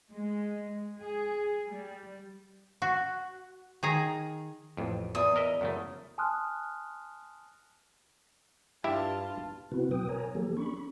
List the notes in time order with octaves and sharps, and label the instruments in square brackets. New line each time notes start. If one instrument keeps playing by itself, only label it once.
[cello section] G#3
G#4
G3
[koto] F#4
D#3 G#4 A#5
[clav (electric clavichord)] A1 F2
[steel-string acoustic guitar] E2 [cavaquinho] D#6
[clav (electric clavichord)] A#4 D#5 E5
F#2 C#3 A3
[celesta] G#5 A5 C6 D#6 F6 F#6
[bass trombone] G2 [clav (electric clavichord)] E4 G4 E5 [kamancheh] F4 A5
[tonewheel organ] C3 B3 C4 E4 F#4 B4
B2 F#3 B4 G5 D#6
A#4 C#5 G#5 A#5
E3 F#3 A#3 G4 A4
C#4 D4 B5 C#6
B5